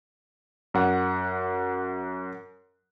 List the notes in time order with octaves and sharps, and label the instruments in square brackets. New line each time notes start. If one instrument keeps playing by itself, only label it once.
[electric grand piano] F#2 F#5